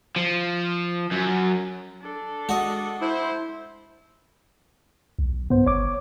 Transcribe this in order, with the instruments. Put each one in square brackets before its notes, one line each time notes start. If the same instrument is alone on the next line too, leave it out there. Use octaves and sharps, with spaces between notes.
[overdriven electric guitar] F3
F#2
[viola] D4 A4
[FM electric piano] G#3 [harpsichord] F#4 D#5
[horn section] E4 C5
[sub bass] B1
[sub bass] G2 [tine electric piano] B3 C5
[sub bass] G1 [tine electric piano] C#5 D6